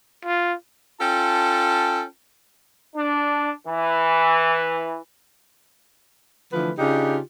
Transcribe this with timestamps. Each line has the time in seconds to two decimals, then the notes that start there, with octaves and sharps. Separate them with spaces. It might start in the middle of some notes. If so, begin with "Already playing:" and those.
0.25 F4
1.00 C#4 F4 A4 G5 A5
2.95 D4
3.66 E3
6.53 D3 E3 F3 A3 B4
6.78 C#3 D4 D#4 F4 G4